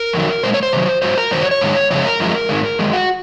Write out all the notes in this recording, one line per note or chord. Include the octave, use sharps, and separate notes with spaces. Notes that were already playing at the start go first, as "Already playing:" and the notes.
Already playing: A#4
F2 D#3 F#3
A#2 G#3 C5
C#5
C5
C3 D#3 F#3
G#2 F#3 C5
A#4
F#2 D#3 F#3 C5
C#5
C#5
G#2 D#3 G#3
F2 C#3 G#3 C#5
A#4
F#2 F3 G#3
G#2 D#3 G#3
F#2 D#3 G#3 G#4
F#4